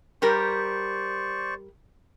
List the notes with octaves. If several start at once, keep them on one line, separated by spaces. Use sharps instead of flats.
G3 G4 A#4 C5 D5 C#6